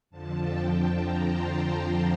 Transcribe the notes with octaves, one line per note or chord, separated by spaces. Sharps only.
F2 D3 F3 A5
G5
A5
A#5
C6
A#5